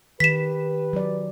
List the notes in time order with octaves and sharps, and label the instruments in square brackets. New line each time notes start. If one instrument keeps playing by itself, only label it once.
[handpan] D#3 [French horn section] G4 B4 [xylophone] B6 E7
[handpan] F#3 D5